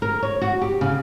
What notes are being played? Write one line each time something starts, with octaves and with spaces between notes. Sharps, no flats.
A#4
C#5
F#4
G4
C#3